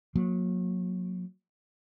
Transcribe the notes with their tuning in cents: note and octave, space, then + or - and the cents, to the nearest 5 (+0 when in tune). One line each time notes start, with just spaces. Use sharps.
F#3 -30 A#3 +0